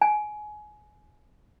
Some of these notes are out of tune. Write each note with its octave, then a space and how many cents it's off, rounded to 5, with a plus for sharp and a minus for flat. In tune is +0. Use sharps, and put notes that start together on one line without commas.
G#5 +20